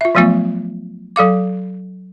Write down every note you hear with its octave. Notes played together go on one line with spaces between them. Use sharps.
F4 E5
F3 F#3 A3 B3 F4
F#3 A4 F5 D6